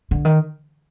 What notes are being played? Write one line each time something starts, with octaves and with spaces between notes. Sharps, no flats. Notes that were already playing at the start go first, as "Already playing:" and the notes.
D3
D#3